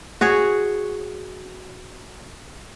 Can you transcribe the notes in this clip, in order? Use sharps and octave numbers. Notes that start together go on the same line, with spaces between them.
F#4 G#4 C#5